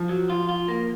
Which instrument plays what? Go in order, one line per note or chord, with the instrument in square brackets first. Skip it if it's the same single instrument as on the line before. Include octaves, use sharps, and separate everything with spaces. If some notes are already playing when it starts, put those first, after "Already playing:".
Already playing: [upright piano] F3
[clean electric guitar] F#3
F4
F4
A#3